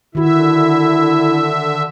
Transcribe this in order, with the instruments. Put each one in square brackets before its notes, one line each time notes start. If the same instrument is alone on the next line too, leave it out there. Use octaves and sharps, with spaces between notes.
[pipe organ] D3 E5 [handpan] D#3 F#4 [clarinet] E4